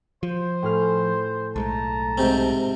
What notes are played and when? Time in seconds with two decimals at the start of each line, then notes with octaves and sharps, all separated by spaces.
0.23 F3 C5
0.63 A2 G#4 F6
1.56 B1 G#3 A3 A5 A#5
2.18 G#2 C3 C4